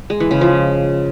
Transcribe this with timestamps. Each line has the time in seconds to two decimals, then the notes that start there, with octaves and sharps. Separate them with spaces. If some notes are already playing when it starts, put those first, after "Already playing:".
0.10 G#3
0.20 E3
0.31 C#3
0.41 F3